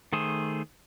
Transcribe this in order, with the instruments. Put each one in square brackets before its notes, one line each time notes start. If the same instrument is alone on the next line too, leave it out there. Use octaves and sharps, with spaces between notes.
[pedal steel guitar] D#3 A3 G#4 C5